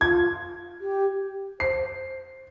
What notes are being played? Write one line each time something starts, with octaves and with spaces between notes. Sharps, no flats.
F4 G#6
G4
C5 C7